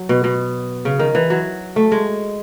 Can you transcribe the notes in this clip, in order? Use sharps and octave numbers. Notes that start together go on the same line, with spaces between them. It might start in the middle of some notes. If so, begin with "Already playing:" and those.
Already playing: F#3
B2
B2
C#3
D#3
E3
F#3
A3
G#3